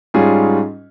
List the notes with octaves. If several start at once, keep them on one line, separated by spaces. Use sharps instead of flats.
G#2 G3 C#4 F4 G#4